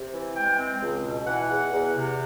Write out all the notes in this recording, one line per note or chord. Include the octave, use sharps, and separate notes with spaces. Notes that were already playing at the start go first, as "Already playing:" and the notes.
Already playing: C3
E3
G#3 G5
C4
C#2
B2
E3 F#5
E2 F#5
E2
C3